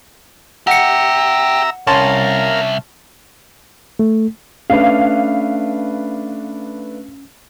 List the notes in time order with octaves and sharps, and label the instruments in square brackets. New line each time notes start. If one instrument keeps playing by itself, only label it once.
[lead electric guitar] G4 [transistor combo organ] E5 A#5 E6 [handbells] F#5 C#7
[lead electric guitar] C2 [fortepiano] C#4 A5 C6 [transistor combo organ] A#4 F5
[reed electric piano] A3
[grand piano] A3 D4 B4 [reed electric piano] C#4 [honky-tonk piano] F5